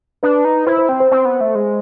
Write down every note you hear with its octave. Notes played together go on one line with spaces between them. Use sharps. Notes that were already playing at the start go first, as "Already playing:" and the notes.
D4 B4
D#4
E4 C5
C5
C4
C5
C4
B3
A3
G#3